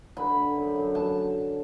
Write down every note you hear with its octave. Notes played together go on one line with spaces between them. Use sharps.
D3 B5
D3
F#2
F#2
F#2 A5